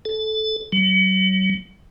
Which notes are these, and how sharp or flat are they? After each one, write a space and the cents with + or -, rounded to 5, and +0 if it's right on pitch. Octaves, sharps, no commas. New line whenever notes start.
A4 -15
F#3 +40